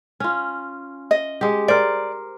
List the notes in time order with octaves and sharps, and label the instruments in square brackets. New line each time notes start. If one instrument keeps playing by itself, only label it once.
[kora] C#4 F4
[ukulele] D#5
[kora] G#3 G4
[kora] A#4 C5 [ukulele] D5